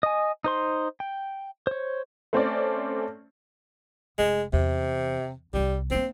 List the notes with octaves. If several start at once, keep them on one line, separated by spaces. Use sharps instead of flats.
D#5 G#5
D#4 C5 C6
G5
C5 C#5
A3 C4 C#4 D5
F1 G#3
E2 C3
C2 G3 D4
A#3 C4 D4